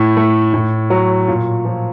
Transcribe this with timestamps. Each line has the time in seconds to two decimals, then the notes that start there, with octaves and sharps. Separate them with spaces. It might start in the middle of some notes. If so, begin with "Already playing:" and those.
Already playing: A2
0.17 A3
0.54 A2
0.90 F#3
1.28 A#2
1.65 F3